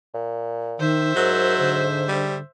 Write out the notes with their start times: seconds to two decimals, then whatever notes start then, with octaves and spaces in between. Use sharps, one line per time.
0.14 A#2
0.79 D#3 C5 E5
1.16 G#2 F#3 A#4
1.59 D3
2.08 G3